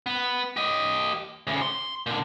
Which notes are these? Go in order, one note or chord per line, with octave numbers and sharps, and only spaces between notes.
B3
G4 D#5
D2 C#3
C6
A#2 D3